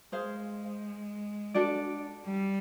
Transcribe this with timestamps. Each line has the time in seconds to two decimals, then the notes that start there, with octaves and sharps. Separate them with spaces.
0.12 G#3 G#4 C5 F5
1.54 D4 F#4 A4 D5
2.25 G3